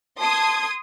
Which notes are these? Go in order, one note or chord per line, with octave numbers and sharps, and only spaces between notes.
A5 C6 D#6 G#6